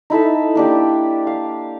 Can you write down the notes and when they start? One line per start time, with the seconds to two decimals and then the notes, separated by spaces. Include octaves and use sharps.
0.10 D#4 E4 A4 E5
0.55 A#3 D4 G4
1.27 F5